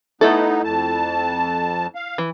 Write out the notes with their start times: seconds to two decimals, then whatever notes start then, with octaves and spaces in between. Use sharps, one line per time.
0.21 A3 B3 D#4 E4 A4
0.64 F2 A5
1.95 F5
2.18 E3